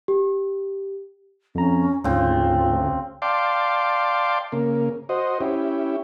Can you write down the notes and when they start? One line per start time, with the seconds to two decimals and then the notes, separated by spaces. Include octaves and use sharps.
0.08 G4
1.55 F2 C#4 A#5
2.04 D2 G#2 C#3 C4 F4
3.22 D5 F5 G5 A5 C6 D6
4.52 C#3 A#3
5.09 F#4 C5 D#5
5.41 C#4 E4 G4